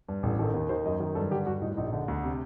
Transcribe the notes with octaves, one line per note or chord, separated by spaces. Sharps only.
G2
A1 A4
D#3 A4
D#2
D#3 C5
F#2 D#5
D#3
G2 A4
D3 G4
G2 F#4
A2 D#4
A#1 D#4
D3
D2
C3